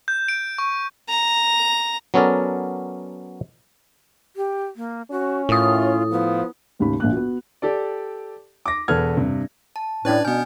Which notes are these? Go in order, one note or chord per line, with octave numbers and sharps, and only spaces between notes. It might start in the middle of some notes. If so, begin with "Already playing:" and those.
G6
D7
C#6
A#5
F#3 B3 C#4 A4 A#4 D5
G4
A#3
C#4 F#4
A2 E4 F4 D#6
F3 B3
A1 D#2 C#3 B5
A#1 A#3 F#6
B3 F#4
G4 A4 D5
D6 A#6
E1 E2 A4 B4 F6 G#6
G2 C3
A5
A2 C#4 D4 B4 D5 G#6
B2 B3 G#5 F6 G6